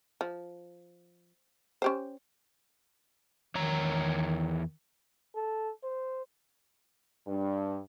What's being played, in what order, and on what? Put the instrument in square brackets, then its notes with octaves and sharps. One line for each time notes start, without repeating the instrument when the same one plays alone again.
[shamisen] F3
C#4 G4 C5
[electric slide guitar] E2 C#5 A#5 [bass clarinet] D#3
[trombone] A4
C5
[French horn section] G2